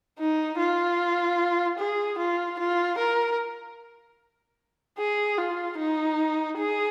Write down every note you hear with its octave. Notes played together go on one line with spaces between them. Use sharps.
D#4
F4
G#4
F4
F4
A#4
G#4
F4
D#4
G#4